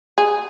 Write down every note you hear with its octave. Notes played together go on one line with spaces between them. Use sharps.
G#4